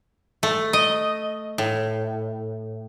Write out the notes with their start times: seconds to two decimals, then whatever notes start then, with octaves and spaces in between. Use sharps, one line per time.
0.43 A3
0.73 D#5
1.58 A2